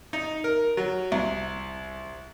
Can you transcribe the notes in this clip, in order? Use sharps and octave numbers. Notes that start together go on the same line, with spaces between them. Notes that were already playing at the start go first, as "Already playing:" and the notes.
D#4
A#4
F#3
C2